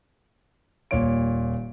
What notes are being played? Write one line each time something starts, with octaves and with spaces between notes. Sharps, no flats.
D#1 A#2 C#5 D7